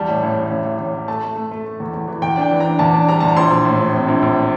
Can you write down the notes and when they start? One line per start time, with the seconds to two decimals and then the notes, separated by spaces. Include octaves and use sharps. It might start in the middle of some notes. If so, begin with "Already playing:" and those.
Already playing: E2 G3 A5
0.09 A2
0.23 A1
0.37 A2
0.51 A1
0.65 A1
0.79 A1
0.93 A1
1.08 A3 A5
1.23 A3
1.36 A3
1.51 A3
1.66 A3
1.80 E2
1.93 E2
2.08 E3
2.22 E2 G5
2.37 D4 G5
2.51 E3
2.60 D4 A#5
2.79 E2 A5
2.94 D4
3.08 G3 A#5
3.20 E2 A5
3.28 A#5
3.37 A#1 C6
3.51 A#1
3.65 A2
3.79 A#1
3.94 C4
4.08 A#1
4.22 A#1